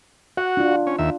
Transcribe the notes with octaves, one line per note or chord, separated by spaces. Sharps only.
F#4 F#5
D4 F4
C#4
D#2 E5